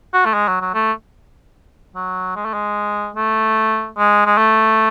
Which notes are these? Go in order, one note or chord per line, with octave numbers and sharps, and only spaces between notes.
F#4
A3
G#3
F#3
F#3
A3
F#3
G#3
A3
G#3
A3
G#3
G#3
A3